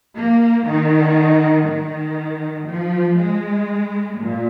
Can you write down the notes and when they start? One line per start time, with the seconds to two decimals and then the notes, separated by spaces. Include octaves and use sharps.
0.17 A#3
0.66 D#3
1.67 D#3
2.67 F3
3.18 G#3
4.18 A#2